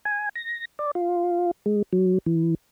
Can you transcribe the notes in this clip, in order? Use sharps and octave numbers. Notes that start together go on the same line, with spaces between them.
G#5
A#6
D5
F4
G#3
F#3
E3